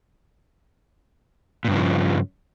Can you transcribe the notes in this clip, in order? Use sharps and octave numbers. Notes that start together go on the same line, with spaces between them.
G2 A#2 C#3 F3